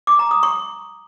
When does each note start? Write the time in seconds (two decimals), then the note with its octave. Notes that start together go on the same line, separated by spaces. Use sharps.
0.07 D6
0.19 A#5
0.31 D#6
0.43 C#6